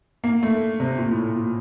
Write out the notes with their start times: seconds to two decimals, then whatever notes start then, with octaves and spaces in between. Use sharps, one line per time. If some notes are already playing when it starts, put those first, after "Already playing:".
0.24 A#3
0.43 A3
0.80 C3
0.98 A#2
1.11 A2
1.35 A#2